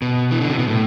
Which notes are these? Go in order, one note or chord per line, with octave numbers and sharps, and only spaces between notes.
B2
E3
D3
C3
B2
A2